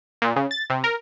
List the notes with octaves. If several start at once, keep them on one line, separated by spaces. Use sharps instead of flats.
A#2
C#3
A6
C3
A#4